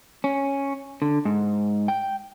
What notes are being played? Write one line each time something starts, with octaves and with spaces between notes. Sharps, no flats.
C#4
D3
G#2
G5